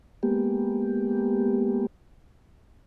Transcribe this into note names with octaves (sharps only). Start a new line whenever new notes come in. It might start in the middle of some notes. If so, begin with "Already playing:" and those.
G#3 A#3 B3 G4